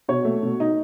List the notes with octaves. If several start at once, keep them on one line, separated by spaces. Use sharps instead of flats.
B2 C#5
A3
B2
D#4